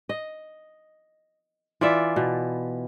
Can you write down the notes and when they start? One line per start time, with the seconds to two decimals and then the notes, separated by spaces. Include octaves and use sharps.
0.09 D#5
1.81 E3 F4 D5 E5
2.16 B2